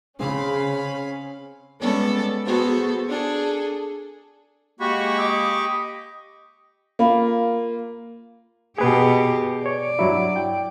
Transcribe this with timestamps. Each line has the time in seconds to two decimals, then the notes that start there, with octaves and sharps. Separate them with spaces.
0.19 C#3 C4 C#4 G#4 F5 B5
1.79 G3 G#3 B3 C#4 A4 D5
2.46 B3 F#4 G#4 A4 C5
3.09 D4 G#4 A4
4.80 G#3 A#3 F#4 G4 B5 C#6
5.19 D#5 D6
6.99 A#3 F4 B5
8.78 B2 G4 G#4 B4
9.66 C#5 D5
9.99 G2 F#3 E4
10.36 G5